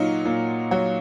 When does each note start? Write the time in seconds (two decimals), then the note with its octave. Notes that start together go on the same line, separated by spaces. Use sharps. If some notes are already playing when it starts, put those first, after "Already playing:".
Already playing: A#2 F#3 D#4 F4
0.25 A#2
0.71 F#3